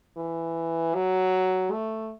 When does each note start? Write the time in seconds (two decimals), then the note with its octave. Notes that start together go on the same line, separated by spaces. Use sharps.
0.17 E3
0.94 F#3
1.72 A3